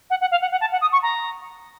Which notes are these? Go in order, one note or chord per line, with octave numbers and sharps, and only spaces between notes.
F#5
F#5
F5
F#5
F#5
A5
F#5
D#6
C#6
A#5